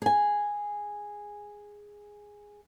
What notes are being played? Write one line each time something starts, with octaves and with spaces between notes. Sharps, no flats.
G#4 G#5